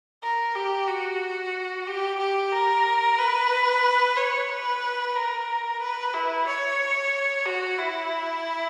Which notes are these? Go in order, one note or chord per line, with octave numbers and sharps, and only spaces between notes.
A#4
G4
F#4
G4
G4
A#4
B4
C#5
B4
A#4
B4
E4
C#5
F#4
E4